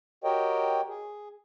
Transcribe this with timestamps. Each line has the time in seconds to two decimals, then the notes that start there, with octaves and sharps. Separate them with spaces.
0.24 F#4 G4 A#4 C#5 D#5 G5
0.89 G#4